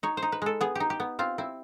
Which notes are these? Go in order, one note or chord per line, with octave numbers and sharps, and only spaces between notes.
D#4 C#5
C5
D#4
B4
G#3 A4
B3 G#4
D#4 G4
G4
B3
C4 F4
C4 E4